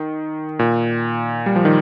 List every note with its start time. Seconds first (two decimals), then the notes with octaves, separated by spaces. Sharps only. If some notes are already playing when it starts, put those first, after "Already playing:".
Already playing: D#3
0.59 A#2
1.46 G3
1.56 F3
1.65 D#3